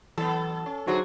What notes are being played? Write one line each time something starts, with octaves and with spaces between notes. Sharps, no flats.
E3 F#3 B3 A4
C#4
D3 F#3 D4 D#4 G#4 C5 F#5